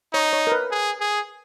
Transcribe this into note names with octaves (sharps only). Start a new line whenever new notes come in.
D#4 C#5
C#5
A#4
B4
G#4
G#4